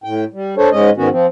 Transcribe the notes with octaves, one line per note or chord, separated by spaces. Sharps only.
A2 G5
G3
D4 A4 C5 C#5
G#2 G#3 C#4 D#5
G#2 D#3 B3 C#4 F#4
F3 C4